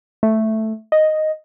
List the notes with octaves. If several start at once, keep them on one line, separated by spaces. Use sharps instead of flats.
A3
D#5